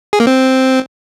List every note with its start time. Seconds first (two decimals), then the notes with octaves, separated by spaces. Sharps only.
0.13 G#4
0.20 A#3
0.27 C4